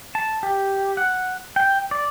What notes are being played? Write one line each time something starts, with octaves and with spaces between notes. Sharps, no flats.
A5
G4
F#5
G5
D5